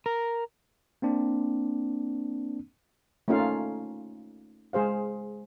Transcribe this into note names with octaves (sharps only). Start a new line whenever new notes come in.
A#4
A#3 C4 D4
A3 A#3 C#4 D#4 F4 F5
G#3 G#4 C5 F5